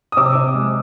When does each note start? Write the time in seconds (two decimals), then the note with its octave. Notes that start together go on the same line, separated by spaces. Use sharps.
0.12 D#6
0.17 C3 D6 E6
0.35 C3
0.55 G#3